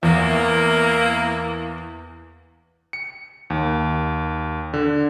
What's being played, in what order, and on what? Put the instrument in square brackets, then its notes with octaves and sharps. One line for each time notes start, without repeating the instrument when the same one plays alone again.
[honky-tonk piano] E2 [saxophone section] A#3 E4
[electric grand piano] C#7
D#2
D3